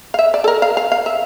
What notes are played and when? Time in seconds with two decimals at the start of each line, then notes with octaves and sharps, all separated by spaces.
0.14 F5
0.19 E5
0.34 D5
0.44 A4
0.48 A#4
0.62 F5
0.77 F5
0.92 F5
1.06 E5